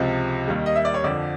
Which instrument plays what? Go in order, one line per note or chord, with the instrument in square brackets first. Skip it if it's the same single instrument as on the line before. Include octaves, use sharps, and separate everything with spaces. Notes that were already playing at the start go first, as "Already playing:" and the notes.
Already playing: [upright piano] C#2 C3 F3
D#2 D#3 G3
D#5
E5
D5
C#5
F2 D3 F3 D5